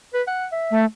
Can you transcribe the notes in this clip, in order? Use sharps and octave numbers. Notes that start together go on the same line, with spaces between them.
B4
F#5
E5
A3